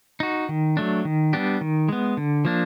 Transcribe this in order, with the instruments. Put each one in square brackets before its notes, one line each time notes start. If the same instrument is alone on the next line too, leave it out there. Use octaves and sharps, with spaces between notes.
[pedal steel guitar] D#4 F#4
D#3
F#3 A3 D4
D#3
G3 B3 D4 G4
D#3
G#3 B3
D3
F3 A#3 D4